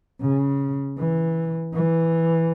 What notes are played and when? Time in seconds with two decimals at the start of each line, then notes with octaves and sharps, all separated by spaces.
0.21 C#3
0.98 E3
1.74 E3